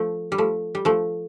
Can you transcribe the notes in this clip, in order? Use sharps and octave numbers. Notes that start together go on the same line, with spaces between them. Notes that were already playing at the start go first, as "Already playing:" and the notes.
Already playing: F3 A3
G3
F3 A3
G3
F3 A3